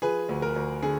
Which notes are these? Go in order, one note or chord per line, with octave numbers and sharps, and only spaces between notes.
F3 G#4 B4
D2
A#4
D2
D3 G#4